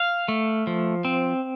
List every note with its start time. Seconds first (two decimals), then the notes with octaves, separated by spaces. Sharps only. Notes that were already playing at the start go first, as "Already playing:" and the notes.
Already playing: F5
0.28 A3
0.67 F3
1.05 C4